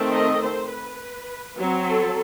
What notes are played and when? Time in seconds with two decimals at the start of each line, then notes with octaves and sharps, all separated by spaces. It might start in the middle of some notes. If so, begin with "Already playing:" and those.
Already playing: D#3 A3 C4
0.12 D#5
0.42 C5
0.71 B4
1.58 F#3 C4
1.88 A4